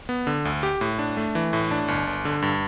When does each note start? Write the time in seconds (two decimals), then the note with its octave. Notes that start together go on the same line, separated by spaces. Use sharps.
0.09 B3
0.27 D3
0.45 D2
0.63 G4
0.81 A2
0.99 D4
1.17 A3
1.35 E3
1.53 A2
1.71 D4
1.88 G1
2.07 G1
2.25 D3
2.42 G2